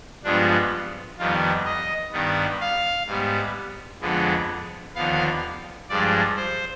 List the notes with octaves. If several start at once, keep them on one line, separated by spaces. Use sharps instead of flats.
G2 F3 G#3 B3 D4
F2 D#3 G3 B3 F4
D#5
G2 D#3 G3 B3
F5
G#2 G3 B3
F2 D3 F3 G#3 B3
D#2 D3 F3 B3 F5
G2 F3 G#3 D5
C5